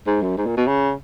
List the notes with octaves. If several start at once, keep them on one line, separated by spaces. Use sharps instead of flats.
G#2
F#2
G#2
A#2
B2
C#3